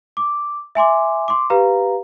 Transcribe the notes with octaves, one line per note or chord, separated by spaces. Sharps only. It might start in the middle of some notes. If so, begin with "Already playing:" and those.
D6
E5 G#5 C6 D6
C6 D6
G4 B4 F5 A#5